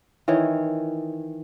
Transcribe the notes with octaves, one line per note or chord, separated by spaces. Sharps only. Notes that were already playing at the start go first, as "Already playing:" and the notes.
D#3 E3 C#5